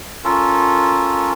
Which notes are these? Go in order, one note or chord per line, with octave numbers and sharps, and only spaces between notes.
C#4 F4 A4 A#4